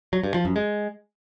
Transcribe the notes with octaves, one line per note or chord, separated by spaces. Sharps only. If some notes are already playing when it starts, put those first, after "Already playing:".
F#3
G2
F3
F#2
G#3